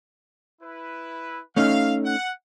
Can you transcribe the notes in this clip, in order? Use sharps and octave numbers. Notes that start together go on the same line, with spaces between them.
E4 B4
A3 C#4 D#4 F5
F#5